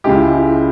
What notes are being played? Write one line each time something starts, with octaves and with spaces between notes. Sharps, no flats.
C#2 C#3 G#3 G4
E4
E4